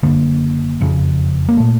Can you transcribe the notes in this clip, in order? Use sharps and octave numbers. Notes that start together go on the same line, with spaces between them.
F#1 F2 D3 A#3
F#1 F2 C#3
A#3
A#2 A3